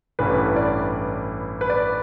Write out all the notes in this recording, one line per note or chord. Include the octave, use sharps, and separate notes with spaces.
A1 G2 E3 B4
D5
B4
D5